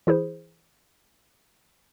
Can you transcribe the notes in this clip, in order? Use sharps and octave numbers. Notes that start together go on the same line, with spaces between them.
E3 E4 G#4 C5